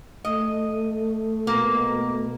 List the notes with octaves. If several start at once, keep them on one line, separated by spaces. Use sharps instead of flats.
A3 D#5
B2 A#3